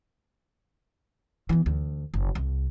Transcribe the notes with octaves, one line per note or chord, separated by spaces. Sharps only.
E3 B3
D2
F#1
C2